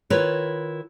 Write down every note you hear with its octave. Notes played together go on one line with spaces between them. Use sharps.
D#3 E4 F4 A#4 B4 C#5